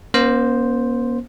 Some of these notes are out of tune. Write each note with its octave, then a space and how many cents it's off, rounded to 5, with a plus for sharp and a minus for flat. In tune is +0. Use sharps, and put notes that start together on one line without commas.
A#3 +45 C#4 +0 C5 +0